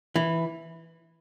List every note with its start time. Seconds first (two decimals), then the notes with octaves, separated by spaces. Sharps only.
0.16 E3